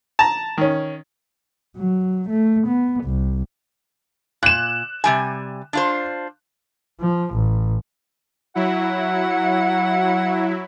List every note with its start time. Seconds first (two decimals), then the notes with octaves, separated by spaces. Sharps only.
0.19 A5 A#5
0.57 D#3 C#4
1.77 F#3
2.29 A3
2.67 B3
3.04 C2
4.43 A#2 F#6 E7
5.04 C3 G3 G#5
5.73 D4 F4 C5
7.00 F3
7.34 A1
8.55 F#3 E4 F#5